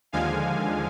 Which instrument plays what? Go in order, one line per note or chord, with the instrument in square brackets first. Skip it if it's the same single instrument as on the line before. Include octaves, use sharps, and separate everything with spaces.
[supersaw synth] D#2 D3 F3 G#3 F5 G#5